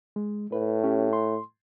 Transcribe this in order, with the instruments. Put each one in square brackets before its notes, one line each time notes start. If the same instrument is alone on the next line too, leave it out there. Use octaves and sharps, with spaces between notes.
[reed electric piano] G#3
[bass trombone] A2 [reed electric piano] B4
[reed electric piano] C#4 G4
C6